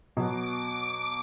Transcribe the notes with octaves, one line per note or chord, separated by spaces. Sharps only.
B2 F#3 B3 D6